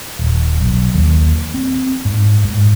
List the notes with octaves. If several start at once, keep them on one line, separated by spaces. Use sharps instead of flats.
D#1
B1
D#2
C4
G#2
G#2